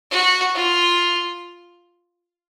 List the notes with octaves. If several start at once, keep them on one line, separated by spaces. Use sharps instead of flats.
F#4
F4